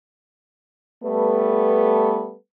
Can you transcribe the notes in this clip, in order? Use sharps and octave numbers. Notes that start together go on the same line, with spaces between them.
G3 A3 B3 A4 B4